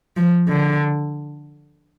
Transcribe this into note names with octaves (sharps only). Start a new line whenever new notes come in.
F3
D3